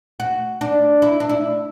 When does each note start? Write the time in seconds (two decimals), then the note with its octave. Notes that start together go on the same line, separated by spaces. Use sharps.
0.20 F#4
0.61 D4
1.02 E4
1.20 D4
1.29 E4